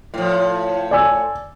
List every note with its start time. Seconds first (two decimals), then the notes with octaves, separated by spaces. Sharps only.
0.14 A2 F3
0.91 D5 G#5 E6